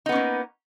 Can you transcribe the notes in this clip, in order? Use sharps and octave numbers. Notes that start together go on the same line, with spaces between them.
A#3 B3 C#4 D#4